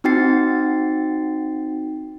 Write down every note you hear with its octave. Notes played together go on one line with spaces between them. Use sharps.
C4 D#4 F#4 G5 A6 C7